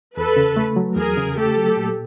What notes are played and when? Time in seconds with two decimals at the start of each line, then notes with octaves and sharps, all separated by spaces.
0.17 E2 A4 B4
0.37 C#3
0.57 A3
0.76 F#3
0.96 E2 G#4 A#4
1.17 C#3
1.36 A3 G4 A4
1.57 F#3
1.77 A#2